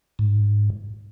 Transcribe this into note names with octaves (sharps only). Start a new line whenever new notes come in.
G#2